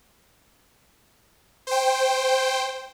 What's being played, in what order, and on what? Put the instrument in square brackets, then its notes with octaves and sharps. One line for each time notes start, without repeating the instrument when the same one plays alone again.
[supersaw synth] C5 G5